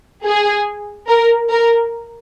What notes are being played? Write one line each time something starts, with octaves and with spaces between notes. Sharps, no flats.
G#4
A#4
A#4